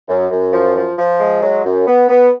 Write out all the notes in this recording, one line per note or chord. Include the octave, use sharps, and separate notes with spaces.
F#2
F#2
F3
F3
F3
G#3
F#3
F#2
B3
B3